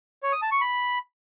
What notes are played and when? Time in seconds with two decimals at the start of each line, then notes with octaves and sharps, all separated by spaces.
0.23 C#5
0.32 D#6
0.42 A5
0.51 C#6
0.61 B5